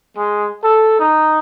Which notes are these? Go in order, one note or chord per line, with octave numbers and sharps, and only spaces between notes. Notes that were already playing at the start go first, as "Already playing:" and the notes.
G#3
A4
D#4